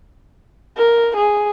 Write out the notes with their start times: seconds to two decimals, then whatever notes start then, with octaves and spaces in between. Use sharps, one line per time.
0.77 A#4
1.16 G#4